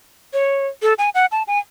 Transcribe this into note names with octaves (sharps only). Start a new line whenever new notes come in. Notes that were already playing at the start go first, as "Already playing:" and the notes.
C#5
A4
G#5
F#5
A5
G#5